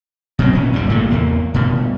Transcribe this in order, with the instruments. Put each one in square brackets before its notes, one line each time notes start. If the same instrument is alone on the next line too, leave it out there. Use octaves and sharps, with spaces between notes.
[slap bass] B2 F#3 C4
A#2 C#4
G#1 D#2 D#3 G3
A#2 C#3 A3
E2 A#3
G2 B2